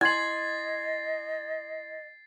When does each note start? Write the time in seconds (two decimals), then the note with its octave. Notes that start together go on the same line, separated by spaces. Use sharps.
0.01 E4 D#5 G#5 C6 A6 C7 F#7